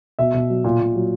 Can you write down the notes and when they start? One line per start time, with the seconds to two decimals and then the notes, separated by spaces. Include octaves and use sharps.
0.19 B2 E5
0.34 B2
0.50 F#3
0.64 A#2
0.80 A#2
0.96 F#3